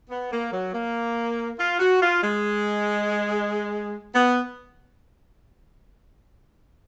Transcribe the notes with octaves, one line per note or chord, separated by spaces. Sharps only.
B3
A#3
F#3
A#3
F4
F#4
F4
G#3
B3